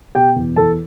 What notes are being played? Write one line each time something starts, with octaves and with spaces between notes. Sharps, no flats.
B2 G4 G5
E2
E2 A4 A5